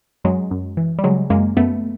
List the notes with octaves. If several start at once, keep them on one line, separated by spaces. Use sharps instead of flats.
F#2 F#3 G#3
F#2
E3
G3
C#3 F#3 G#3
F#2 G#3 A#3
F#2 A3 B3